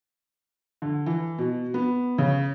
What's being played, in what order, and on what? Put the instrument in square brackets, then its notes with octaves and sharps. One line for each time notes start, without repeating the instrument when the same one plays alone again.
[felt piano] D3
E3
B2
B3
C#3